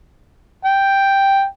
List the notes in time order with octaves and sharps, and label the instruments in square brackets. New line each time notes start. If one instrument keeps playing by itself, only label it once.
[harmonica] G5